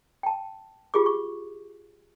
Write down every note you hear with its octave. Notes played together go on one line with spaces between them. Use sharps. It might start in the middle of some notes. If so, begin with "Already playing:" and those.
G5 A5
F4 G4 G#4 D6
C#6